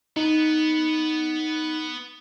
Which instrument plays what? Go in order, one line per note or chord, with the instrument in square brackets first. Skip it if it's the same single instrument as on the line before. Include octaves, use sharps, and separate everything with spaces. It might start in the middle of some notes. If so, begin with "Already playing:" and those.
[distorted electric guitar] B3 [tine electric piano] D#4